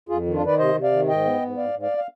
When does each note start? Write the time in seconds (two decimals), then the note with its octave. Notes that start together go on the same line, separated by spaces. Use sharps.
0.09 F2 F4 G#4
0.26 D#3
0.34 D4 F4
0.42 D#3 B4 D5
0.58 C3 C5 D#5
0.75 C3
0.83 D5 F5
0.92 D#3
1.08 G#2 D#5 G5
1.25 B3
1.42 G#2
1.58 G#2 D5 F5
1.74 G#2
1.82 D5 F5
1.97 F5